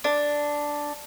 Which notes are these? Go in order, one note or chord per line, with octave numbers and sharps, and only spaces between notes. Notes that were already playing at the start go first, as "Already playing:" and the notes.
D4